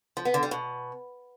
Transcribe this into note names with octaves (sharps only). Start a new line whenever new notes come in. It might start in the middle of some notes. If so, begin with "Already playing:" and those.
F3
B3
D3
G3
B2